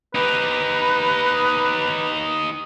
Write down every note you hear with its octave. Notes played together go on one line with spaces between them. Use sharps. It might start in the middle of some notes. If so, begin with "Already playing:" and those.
D#4 G4 B4